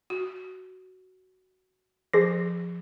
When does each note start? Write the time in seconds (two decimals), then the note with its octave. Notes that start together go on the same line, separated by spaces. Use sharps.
0.10 F#4
2.13 F3 G#4 C5 A#6